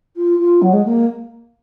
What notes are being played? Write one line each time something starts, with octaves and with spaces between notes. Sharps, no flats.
F4
F4
F#3
G#3
A#3